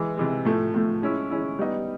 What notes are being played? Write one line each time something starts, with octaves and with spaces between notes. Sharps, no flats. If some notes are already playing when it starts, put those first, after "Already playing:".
Already playing: E3 G#3
C3 E3 G#3
A2 F3 A3
A2 F3 A3
G#3 C#4 E4
G#3 C#4 E4
G3 B3 D#4